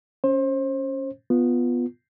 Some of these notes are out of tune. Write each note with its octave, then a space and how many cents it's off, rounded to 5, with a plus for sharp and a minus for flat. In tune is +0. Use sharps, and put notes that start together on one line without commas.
C#4 +0 C5 +30
B3 +0 F4 +0